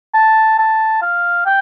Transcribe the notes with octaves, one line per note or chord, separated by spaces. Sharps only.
A5
A5
F5
G5